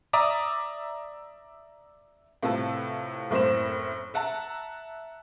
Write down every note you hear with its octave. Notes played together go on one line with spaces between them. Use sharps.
D5 E5 A#5 D6 D#6
A2 C3 F4 A4 B4 A5
F#1 A2 C4 C5 C6 E7
E5 F#5 A5 A#5